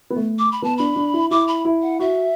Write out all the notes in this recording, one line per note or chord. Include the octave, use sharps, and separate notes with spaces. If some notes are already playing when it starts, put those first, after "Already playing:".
B3
A3
D6
B5
B3 A5
D4 B5
D4
E4
E4 D6
B5
E4
F#5
F#4 E5